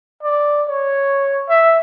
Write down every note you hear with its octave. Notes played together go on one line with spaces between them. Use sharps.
D5
C#5
E5